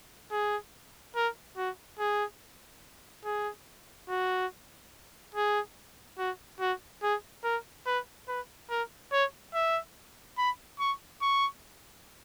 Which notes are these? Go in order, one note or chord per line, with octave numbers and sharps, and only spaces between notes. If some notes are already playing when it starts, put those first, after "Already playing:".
G#4
A#4
F#4
G#4
G#4
F#4
G#4
F#4
F#4
G#4
A#4
B4
B4
A#4
C#5
E5
B5
C#6
C#6